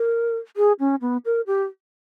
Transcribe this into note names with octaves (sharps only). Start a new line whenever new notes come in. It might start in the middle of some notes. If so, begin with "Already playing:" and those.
Already playing: A#4
G#4
C#4
B3
A#4
G4